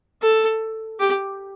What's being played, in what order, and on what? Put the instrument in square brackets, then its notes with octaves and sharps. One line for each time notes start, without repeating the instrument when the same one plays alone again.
[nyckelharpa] A4
G4